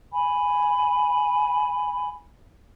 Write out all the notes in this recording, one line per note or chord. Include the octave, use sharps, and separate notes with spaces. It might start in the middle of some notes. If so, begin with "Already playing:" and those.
G#5 B5